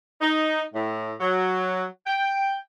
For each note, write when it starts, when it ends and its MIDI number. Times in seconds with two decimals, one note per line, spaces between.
0.21 0.63 63
0.74 1.12 45
1.20 1.84 54
2.07 2.56 79